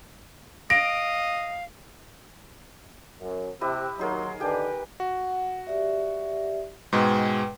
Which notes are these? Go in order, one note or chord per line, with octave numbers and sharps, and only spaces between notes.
D#5 F5 A#6 D7
F#2
C3 E4 G4 D#5 G5 E6 F#6
D#2 F#3 D#4 G#4 A#4 C6
D3 D#3 D4 G4 B4 G5 G#5
F#4 F#5
G4 D5 E5
G#2 B2 G#3 B4 G5